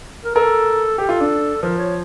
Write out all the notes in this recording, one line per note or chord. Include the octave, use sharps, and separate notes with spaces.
A#4
A4 A#4
G4 A4
F4
D4
F3 A#4
C#5